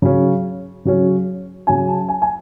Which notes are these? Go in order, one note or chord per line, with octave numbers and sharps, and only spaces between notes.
C#3 F#3 C#4
C#3 F#3 C#4
C#3 F#3 C#4 G#5
A5
G#5
G#5